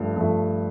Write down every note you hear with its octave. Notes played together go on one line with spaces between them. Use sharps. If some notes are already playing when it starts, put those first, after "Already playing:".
Already playing: G2 F3 A3
G2 F3 A3